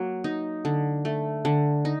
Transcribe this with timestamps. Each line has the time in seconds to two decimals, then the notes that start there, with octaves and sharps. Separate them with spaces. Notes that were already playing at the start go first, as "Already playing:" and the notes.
Already playing: F#3 A#3
0.24 D#4
0.65 D3
1.05 A3
1.45 D3
1.85 D#4